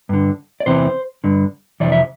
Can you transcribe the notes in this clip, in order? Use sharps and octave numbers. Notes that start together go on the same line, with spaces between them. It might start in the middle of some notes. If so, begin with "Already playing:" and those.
G2 D3
D5
E2 C3 E3 C5
G2 D3
F2 C3 E3 D5
E5